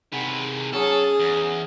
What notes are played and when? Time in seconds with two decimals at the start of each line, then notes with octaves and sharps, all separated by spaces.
0.12 C3 D#3 G#4 B4 F#5
0.73 F#3 C#4 G#4 A4 C#5
1.19 E2